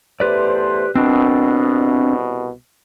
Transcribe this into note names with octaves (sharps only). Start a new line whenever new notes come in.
E2 A3 G4 B4 C5 D5
C2 B2 C4 D4